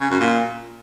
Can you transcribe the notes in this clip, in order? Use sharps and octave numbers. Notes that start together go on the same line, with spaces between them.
C#3
F#2
A#2